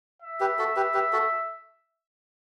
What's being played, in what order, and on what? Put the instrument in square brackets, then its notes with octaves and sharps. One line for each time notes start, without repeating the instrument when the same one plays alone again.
[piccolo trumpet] E5
[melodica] G4 B4
F#4 A4
G4 B4
G4 B4
F#4 A4